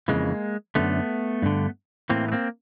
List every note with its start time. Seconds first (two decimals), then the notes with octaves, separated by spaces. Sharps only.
0.08 F2 C#3 E3 G#3 A#3
0.75 F#2 D3 A3 B3
1.42 G2 D3
2.10 A2 E3 A#3 C4
2.28 B3
2.32 A#3 C4